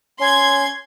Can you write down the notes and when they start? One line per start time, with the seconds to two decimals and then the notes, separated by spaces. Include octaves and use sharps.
0.20 C#4 C6 G#6